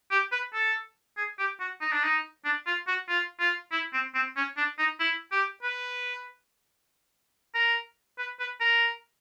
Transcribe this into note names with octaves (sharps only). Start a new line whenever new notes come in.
G4
B4
A4
G#4
G4
F#4
D#4
D4
D#4
D4
F4
F#4
F4
F4
E4
C4
C4
C#4
D4
D#4
E4
G4
B4
A#4
B4
B4
A#4